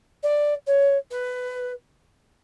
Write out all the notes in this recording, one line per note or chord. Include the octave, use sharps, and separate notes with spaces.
D5
C#5
B4